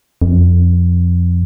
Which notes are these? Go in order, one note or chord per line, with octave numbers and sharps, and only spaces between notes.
F2